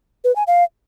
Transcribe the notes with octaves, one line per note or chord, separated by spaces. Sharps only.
B4
G#5
F5